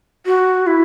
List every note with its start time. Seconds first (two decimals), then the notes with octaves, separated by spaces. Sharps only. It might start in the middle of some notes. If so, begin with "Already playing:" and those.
0.26 F#4
0.66 E4